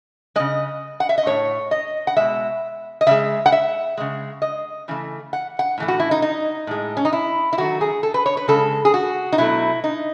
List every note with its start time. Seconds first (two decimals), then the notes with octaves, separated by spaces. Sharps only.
0.36 C#3 G#3 D#5
1.00 F#5
1.09 E5
1.18 D#5
1.26 A2 E3 A3 C#5
1.71 D#5
2.07 F#5
2.16 B2 G#3 E5
3.01 D#5
3.07 C#3 G#3 E5
3.46 F#5
3.52 E5
3.97 C#3 G#3
4.42 D#5
4.88 C#3 E3 A3
5.33 F#5
5.59 F#5
5.78 A2 E3 A3
5.88 F#4
6.00 E4
6.11 D#4
6.22 D#4
6.67 A2 G#3
6.97 C#4
7.05 D#4
7.13 E4
7.53 E4
7.58 D#3 F#3 A3 F#4
7.81 G#4
8.03 A4
8.14 B4
8.26 C#5
8.37 B4
8.48 C#3 G#3 A4
8.85 G#4
8.94 F#4
9.32 D#4
9.38 B2 F#3 A3 E4
9.84 D#4